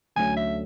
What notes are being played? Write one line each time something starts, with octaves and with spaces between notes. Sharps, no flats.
D2 D3 F#3 A3 C#4 G#5
E5